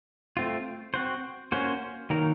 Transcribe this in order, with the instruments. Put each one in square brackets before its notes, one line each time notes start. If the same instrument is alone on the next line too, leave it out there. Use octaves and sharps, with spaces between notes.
[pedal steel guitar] A3 C4 F4
C4 F#4 C5
A#3 C#4 F#4 C5
D#3 F#3 A#3 D#4 A#4